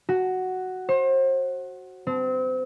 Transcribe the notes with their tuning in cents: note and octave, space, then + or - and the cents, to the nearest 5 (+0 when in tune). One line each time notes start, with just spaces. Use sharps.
F#4 +5
C5 +35
C4 -30